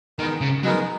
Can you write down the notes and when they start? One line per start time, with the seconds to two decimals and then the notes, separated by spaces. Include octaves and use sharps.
0.19 D#3 G#3 B3 D#4 A#4
0.41 C#3
0.64 F#3 G#3 B3 D#4 A#4